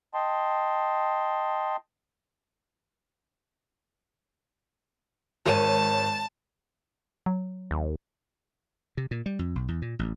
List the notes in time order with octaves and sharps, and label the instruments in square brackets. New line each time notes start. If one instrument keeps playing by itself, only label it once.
[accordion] D#5 G5 A5 C6
[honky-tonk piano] G#1 C#5 D#7 [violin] A5
[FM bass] F#3
[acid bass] D#2
[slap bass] C3
A#2
G3
F2
B1
E2
A#2
A1